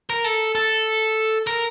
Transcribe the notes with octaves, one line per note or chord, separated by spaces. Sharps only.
A#4
A4
A4
A#4